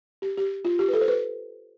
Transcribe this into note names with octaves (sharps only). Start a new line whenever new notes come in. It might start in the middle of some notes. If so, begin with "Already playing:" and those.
G4
G4
F4
G4
B4
A4
C5
B4